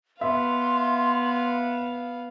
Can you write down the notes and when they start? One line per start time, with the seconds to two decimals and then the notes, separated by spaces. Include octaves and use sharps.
0.21 B3 E5 F5 C6